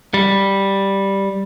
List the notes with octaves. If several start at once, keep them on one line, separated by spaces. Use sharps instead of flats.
G3